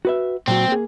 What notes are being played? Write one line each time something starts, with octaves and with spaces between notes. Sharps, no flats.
F#4 B4 E5
A#2 F#3 C4 F#4
A#3 G#4